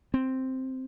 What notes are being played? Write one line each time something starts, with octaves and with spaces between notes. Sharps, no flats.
C4